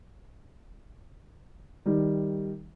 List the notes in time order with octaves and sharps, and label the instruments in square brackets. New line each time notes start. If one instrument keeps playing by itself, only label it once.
[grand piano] D#3 G3